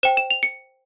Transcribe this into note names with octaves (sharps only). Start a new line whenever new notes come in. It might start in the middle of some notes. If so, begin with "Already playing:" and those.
C5 G5 E7
E7
F7
C#7